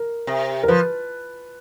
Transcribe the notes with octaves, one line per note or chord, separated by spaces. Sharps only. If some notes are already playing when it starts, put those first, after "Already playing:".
Already playing: A#4
C3
A#4
F3 B4